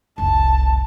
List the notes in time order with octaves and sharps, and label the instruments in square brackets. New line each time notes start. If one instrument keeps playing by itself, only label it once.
[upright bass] F1 C2 [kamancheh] A5